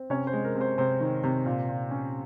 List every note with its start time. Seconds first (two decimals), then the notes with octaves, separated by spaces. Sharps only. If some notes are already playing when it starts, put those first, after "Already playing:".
Already playing: C4
0.10 C3 C#4 C#5
0.27 C5
0.33 G#3
0.44 A#4
0.55 C3
0.61 C5
0.78 C3 C5
1.00 D#3
1.24 C3
1.46 A#2
1.69 A#2
1.91 C#4